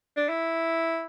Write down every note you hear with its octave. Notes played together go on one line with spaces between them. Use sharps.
D4
E4